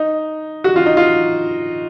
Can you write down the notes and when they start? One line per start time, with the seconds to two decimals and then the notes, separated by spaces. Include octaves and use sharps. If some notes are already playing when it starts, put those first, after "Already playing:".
Already playing: D#4
0.64 F#4
0.76 F4
0.86 D#4
0.97 F4